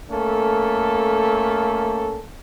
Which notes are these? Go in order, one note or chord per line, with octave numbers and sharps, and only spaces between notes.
A3 A#3 C#4 A4